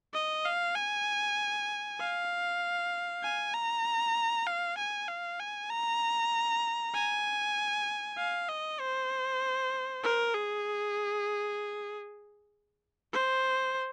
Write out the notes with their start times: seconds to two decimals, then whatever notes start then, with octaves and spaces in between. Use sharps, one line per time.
0.14 D#5
0.45 F5
0.76 G#5
2.00 F5
3.23 G#5
3.54 A#5
4.47 F5
4.78 G#5
5.08 F5
5.40 G#5
5.70 A#5
6.95 G#5
8.18 F5
8.49 D#5
8.80 C5
10.04 A#4
10.34 G#4
13.13 C5